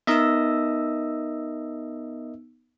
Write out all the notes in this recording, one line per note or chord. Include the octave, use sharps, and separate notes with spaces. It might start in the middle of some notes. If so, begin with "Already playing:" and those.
B3 D#4 A#4 D#5 E5 E6